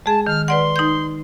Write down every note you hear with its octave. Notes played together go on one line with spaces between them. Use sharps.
G#3 G#4 A5
D#3 F6
B4 D5 F#5 C6
D#4 G6